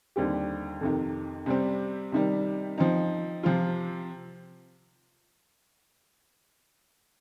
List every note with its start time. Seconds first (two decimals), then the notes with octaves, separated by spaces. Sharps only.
0.16 D#2 D3 G3 C4 G4
0.81 F2 C3 D#3
1.46 C3 G3 C4
2.12 C3 D#3 G3
2.78 F3 C4 D#4
3.43 C3 F3 C4 F4